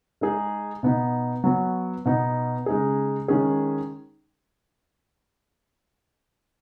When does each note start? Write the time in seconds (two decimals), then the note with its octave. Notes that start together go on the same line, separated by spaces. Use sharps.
0.21 G#3 D#4 G#4
0.83 B2 B3 D#4
1.44 F#3 B3 F#4
2.05 B2 B3 D#4
2.66 C#3 G#3 D#4 G#4
3.28 D#3 G#3 C#4 G#4